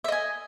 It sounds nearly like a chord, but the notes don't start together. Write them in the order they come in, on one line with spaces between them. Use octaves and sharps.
E5 D#5 G#5